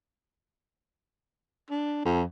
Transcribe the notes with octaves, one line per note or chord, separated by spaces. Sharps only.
D4
F2